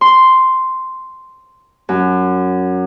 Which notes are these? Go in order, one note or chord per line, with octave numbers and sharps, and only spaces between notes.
C6
F#2